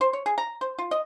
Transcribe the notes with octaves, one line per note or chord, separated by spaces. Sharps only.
C5
C#5
G#4
A#5
C5
F4
D#5